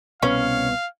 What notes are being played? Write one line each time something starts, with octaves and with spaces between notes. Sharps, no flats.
C2 B2 B3 C#4 F5